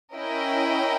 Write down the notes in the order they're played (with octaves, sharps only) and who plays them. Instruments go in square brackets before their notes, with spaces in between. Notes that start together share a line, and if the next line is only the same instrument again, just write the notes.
[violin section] C#4 E4 A#4 D#5 G5